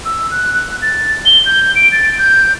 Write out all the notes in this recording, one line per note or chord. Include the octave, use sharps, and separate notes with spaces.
E6
F#6
F#6
A6
G7
G6
D7
A6
G6